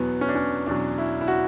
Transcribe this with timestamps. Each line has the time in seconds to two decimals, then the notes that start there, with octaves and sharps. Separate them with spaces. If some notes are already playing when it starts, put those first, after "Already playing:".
Already playing: E2 B2 F#3 B3
0.21 C#4
0.29 D4
0.35 C#4
0.67 E2 B2 F#3 D4
0.98 E4
1.21 E4
1.28 F#4